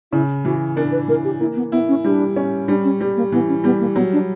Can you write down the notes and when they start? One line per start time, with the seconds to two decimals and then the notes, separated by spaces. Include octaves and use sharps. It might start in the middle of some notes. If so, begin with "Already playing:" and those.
0.12 C#3 E4
0.45 E3 F#4
0.76 D4 A#4
0.92 B4
1.08 E3 A#4
1.24 G4
1.40 A#3 E4
1.56 B3
1.72 B3 E4
1.88 C#4
2.04 G3 D4
2.36 C#4
2.68 G3 D4
2.84 C#4
3.01 G3
3.16 A#3
3.32 E3 B3
3.48 C#4
3.64 G3 B3
3.80 A#3
3.96 F#3 B3
4.13 D4